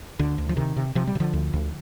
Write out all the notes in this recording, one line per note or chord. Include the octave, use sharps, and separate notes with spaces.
D2 D3
D2
F3
C3 D#3
C3
C3 F3
G3
C3
D3 F3
D2
D2